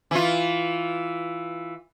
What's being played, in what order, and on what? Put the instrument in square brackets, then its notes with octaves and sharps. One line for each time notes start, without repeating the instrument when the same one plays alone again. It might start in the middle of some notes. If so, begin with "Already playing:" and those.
[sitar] E3 F4